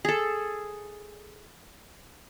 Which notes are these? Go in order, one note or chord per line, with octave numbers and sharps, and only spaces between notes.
G#4 A4